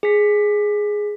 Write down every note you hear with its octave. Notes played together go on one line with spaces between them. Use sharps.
G#4 B6